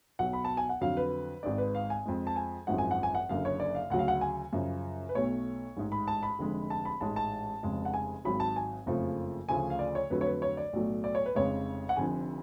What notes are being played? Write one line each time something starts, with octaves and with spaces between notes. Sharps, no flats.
B1 B2 F#3 F#5
B5
A5
G#5
F#5
F2 D3 F#3 F5
B4
G#1 G#2 G#3 D5
B4
F5
G#5
F2 F3 G#3
A5
G#5
G#1 F#2 F3 G#3 F#5
G#5
F#5
G#5
F#5
F#1 F#2 D3 F5
C#5
D5
F5
D2 C#3 F#3 F#5
F5
F#5
G#5
F#2 C#3 F3
B4
B1 B2 A3 C#5
A1 G#2 G#3
B5
A5
B5
F1 F2 D3 G#3
A5
B5
A1 G#2 G#3 A5
A5
F1 F2 C#3 G#3
F#5
G#5
G#1 G#2 F#3 B5
A5
G#5
F#1 F2 C#3 F3 A3
D2 C#3 F3 A3 G#5
F5
D5
C#5
F2 D3 F#3 A3 B4
C#5
B4
C#5
D5
B1 A2 F#3 A3
D5
C#5
B4
F1 F2 C#3 G#3 C#5
F#5
F1 F2 D3 F3 G#5